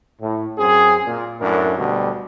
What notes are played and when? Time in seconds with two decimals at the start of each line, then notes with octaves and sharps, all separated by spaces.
0.21 A2
0.58 F#2 C4 G#4
1.06 A#2
1.40 F#2 A2 D4 A#4
1.77 D2 B2 G3